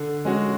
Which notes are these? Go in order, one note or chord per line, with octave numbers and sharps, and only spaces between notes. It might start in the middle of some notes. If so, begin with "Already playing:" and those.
Already playing: D3
G#3 C#4 F#4